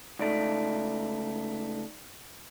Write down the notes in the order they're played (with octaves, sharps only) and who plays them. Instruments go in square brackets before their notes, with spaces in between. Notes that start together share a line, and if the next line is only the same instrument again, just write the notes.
[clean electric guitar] C#2 A3 [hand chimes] D#4 D5 D7